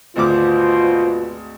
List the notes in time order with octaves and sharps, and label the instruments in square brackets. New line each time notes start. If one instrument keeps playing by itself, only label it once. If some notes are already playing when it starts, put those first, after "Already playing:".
[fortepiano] G#1 D2 D6 [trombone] B2 [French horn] F4 [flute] C5